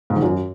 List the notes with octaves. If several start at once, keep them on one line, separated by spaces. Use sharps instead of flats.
G#2
D#3
F#2